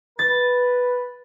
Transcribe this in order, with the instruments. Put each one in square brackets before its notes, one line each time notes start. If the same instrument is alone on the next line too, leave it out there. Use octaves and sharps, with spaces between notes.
[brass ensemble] B4 [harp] A6